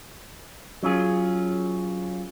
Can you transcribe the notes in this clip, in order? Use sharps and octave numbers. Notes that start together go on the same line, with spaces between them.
F#3 C#4 F4 G#4